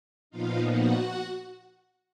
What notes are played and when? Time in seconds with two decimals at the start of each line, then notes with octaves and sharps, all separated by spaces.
0.30 A#2 F3 B3 D#4 F4 F5
0.69 F#4 F#5